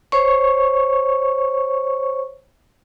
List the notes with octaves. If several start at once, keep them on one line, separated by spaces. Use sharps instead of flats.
C5 C#5 C#6